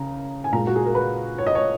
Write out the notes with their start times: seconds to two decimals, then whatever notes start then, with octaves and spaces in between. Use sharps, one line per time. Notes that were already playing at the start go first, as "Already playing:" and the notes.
Already playing: C#3 A#5
0.44 G#5
0.52 A#2 G#3 A#5
0.67 F#4
0.76 G#4
0.86 A#4
0.95 B4
1.38 C#5
1.47 D#5
1.55 C#5